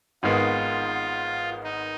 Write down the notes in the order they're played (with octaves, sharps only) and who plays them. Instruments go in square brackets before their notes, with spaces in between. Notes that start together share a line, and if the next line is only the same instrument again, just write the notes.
[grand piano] G#1 G#2 D#3 G#3 B3 [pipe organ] F4
[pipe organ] D#4